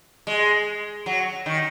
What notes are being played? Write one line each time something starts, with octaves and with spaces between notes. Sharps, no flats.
G#3
F#3
D#3